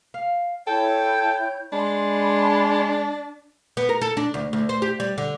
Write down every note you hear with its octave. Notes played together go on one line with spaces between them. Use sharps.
F5
E4 A4 C#5 G5 G6
G#3 D4 B5 C6
B3
A#4
A4
D4
D2
D2
C5
G4
G3
D3